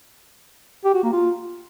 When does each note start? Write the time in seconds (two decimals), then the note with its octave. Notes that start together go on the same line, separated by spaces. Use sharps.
0.85 G4
0.94 F#4
1.03 A#3
1.13 F4